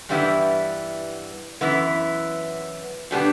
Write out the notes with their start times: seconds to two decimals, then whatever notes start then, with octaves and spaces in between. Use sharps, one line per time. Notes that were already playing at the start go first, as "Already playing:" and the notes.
0.09 G2 E3 G3 B3 E4
1.61 F#2 E3 B3 E4
3.11 B2 G3 B3 D4